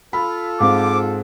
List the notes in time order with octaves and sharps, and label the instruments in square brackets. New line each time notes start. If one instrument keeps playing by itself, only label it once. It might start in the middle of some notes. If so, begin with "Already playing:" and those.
[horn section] F4 A4 [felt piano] B5
[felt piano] G#2 C4 [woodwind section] F3 D6